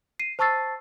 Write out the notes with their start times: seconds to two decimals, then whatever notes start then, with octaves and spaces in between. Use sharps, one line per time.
0.19 C7 D#7
0.39 C5 A5 C#6 E6 A6 C7